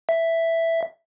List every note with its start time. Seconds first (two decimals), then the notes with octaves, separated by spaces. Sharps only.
0.09 E5